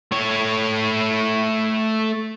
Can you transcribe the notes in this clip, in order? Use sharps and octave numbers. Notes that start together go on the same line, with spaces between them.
A3 C#5